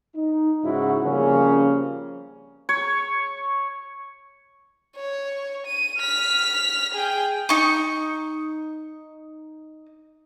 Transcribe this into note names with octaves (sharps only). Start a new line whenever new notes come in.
D#4
G#2 C#3 E4 F#4
C#3 F3 G3 A#3 C4 C#4
C#5
C#5
D#7
F6 B6
G#4 G5
D#4 C#6